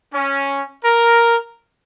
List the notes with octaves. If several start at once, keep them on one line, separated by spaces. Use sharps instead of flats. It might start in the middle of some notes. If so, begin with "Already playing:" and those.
C#4
A#4